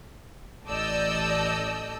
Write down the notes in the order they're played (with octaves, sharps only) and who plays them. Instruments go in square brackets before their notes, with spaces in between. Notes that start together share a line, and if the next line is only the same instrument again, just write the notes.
[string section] A1 A4 D5 D#5 E6 G6